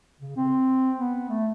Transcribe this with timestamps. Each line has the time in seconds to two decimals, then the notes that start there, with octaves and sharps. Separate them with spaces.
0.21 C#3
0.36 C4
0.98 B3
1.29 A3